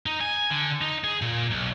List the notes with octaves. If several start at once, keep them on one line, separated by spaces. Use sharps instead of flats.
D#4
G#5
D3
D#4
G#4
A#2
B1